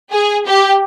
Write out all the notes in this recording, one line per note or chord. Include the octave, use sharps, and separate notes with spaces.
G#4
G4